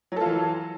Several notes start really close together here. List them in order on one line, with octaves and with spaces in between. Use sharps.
F#3 A4 F4 E3